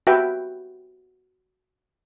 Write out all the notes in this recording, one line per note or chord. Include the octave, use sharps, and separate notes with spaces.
F#4 G4 B4 E5 G5